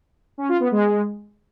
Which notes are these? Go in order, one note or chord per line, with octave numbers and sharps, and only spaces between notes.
C#4
F4
B3
G#3